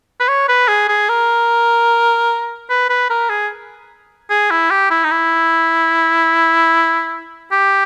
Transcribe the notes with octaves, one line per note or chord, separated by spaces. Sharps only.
B4
C#5
B4
G#4
G#4
A#4
B4
B4
A#4
G#4
G#4
E4
G4
E4
D#4
E4
G4